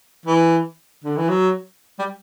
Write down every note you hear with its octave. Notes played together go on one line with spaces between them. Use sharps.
E3
D3
E3
F#3
G3